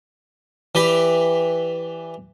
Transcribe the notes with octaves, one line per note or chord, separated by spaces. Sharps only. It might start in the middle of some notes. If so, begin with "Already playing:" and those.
E3 G4 D5 B5